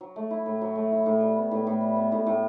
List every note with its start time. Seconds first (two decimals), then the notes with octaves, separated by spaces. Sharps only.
0.01 F#3
0.16 A3
0.31 E4
0.46 A2
0.61 F#3
0.75 A3
0.92 E4
1.06 A2
1.21 G3
1.36 B3
1.51 A2
1.67 A2
1.81 G3
1.96 B3
2.12 A2
2.27 A2